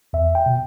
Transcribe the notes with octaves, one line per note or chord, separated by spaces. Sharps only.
E2 E5
G5
B2